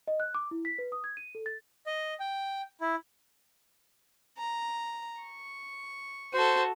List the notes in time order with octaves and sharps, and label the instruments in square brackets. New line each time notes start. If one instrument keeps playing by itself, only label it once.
[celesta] D#5
F#6
D6
E4
B6
B4
D#6
G#6
D#7
A4
A6
[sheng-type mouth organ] D#5
G5
E4
[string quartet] A#5
C#6
[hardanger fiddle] F#4 A4 [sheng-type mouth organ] C5